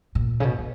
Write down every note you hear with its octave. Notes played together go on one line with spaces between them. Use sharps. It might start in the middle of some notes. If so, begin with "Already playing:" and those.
A#2
C#3
B2
B2